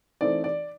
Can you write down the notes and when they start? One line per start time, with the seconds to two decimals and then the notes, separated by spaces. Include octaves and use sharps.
0.21 E3 A3 C4 D#4 D5
0.44 D5